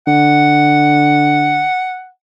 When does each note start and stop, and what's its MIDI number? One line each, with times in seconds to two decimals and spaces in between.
0.07 1.66 50
0.07 2.08 78